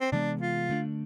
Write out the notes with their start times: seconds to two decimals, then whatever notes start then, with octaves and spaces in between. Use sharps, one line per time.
0.01 C4
0.12 C3 E3 G#3 B3 D4
0.41 F4
0.69 D3 A3 D4